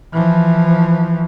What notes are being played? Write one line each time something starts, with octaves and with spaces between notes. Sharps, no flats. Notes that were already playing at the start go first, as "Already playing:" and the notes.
E3 F3